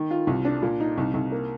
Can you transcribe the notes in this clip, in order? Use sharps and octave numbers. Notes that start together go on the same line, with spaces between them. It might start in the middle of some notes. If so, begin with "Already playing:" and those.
Already playing: D#3
F4
C2
D4
A#2
D#4
C2
C2
A#3